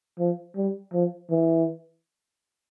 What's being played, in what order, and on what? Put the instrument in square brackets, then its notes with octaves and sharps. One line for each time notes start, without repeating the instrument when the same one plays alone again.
[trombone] F3
G3
F3
E3